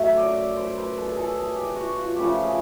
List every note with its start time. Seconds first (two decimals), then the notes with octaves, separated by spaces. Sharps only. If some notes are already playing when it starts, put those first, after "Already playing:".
Already playing: F#2 F#3 A3 E5
0.17 D5
0.57 C5
0.76 B4
0.98 A4
1.11 G#4
1.17 A4
1.36 G#4
1.56 G4
1.76 F#4
1.97 F4
2.16 C#3 F3 A3 G4
2.43 G#4